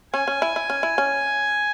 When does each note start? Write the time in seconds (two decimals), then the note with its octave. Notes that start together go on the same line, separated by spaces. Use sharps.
0.14 C#4 G#5
0.28 C#4
0.42 E4
0.56 E4
0.70 C#4
0.83 E4
0.98 C#4